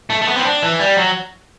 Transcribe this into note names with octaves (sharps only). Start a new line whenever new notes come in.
A3
A3
B3
C4
D4
E3
G3
F#3